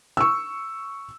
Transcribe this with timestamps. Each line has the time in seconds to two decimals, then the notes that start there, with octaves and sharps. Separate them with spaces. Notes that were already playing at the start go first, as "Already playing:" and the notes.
0.17 C#6 E6